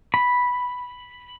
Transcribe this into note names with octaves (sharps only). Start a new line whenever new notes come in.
B5